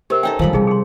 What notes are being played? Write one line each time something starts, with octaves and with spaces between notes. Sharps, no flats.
C3 G4 A#4
C#4 D#4 A4 G5
D#3 F3 G3 B5
C3 G3 D#4 G#4
G#4 C6